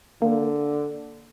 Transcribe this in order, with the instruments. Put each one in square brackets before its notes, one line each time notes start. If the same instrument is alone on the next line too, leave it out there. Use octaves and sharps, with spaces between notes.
[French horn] D3 [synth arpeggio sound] A#3